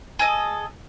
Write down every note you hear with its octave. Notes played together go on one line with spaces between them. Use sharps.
G#4 A4 D#5